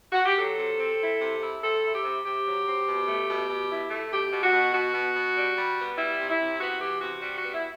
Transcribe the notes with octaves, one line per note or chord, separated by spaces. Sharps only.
F#4
G4
F#3 A4
C3
C4
E4
C3
E4
C4 A4
E4
G4
C3
C3 G4
F#3
C4
B2
A3
B2
B2
E4
A3
B2 G4
B2
F#4
B2
B2 F#4
B2
B2
G3
G3
B3
G3 E4
C3
E4
C3
B3 F#4
E3 G4
C3 F#4
G3 F#4
F#4
B3
E4